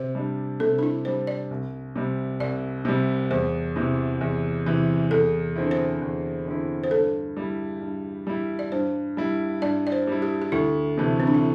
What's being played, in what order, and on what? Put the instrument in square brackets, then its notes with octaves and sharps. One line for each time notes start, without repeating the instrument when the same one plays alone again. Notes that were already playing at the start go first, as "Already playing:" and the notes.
Already playing: [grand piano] C3 [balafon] C5
[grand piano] G3 D4
[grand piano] C3 [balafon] A4
[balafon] D4
E4
[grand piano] G3 D4 [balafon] C5
[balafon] D5
[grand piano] C2
C3 G3
[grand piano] C2 [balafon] D5
[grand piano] C3 G3
[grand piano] E2 [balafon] C5
[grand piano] C3 E3
E2
C3 E3
[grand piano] E2 [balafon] A4
[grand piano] D3 C4 E4
[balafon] C5
[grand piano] E2
D3 C4 E4
[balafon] C5
[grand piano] G2 [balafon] A4
[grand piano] G3 E4
G2
G3 E4
[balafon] D5
[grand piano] G2 [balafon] C5
[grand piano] G3 E4
[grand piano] G2 [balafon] D5
[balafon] D5
C5
[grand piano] G3 E4
[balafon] G4
G4
[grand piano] D2 [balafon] E4
[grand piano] C3 E3 A3
[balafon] C4
D4
E4